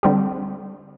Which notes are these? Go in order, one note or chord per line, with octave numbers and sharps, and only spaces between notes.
D3 G3 C4 G4